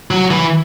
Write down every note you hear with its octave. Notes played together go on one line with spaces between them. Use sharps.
F#3
E3